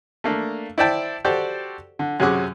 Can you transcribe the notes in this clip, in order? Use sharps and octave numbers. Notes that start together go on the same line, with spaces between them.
A3 A#3 D4
E4 C5 D5 E5 G5 A5
F#4 G4 A4 C5 D5 G5
D3
F#2 C3 C#4 G#4 F#5 D6